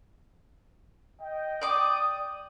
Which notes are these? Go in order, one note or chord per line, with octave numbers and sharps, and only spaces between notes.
D#5 G5
D5 G5 D6 D#6